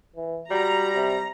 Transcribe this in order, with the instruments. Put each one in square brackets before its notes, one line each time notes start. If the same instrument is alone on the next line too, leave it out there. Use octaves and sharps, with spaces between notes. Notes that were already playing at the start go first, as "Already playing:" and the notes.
[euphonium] E3
[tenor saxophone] G3 [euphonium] F#4 [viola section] A#5
[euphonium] C3